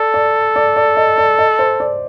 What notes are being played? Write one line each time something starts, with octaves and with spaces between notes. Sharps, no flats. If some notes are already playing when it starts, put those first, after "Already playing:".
Already playing: A4 D5
D5
D5
D5
D#5
D5
D#5
C5
D5